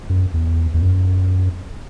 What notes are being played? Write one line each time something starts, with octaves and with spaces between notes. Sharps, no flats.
F#2
E2
E2
F#2